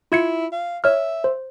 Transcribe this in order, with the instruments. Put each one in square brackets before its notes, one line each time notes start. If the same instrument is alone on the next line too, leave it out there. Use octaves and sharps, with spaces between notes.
[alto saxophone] E4 [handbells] F4 G#6 C#7
[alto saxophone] F5
[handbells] C#5 F6 [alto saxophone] E5
[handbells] C5